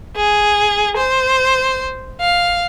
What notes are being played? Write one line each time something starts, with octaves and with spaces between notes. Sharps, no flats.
G#4
C5
F5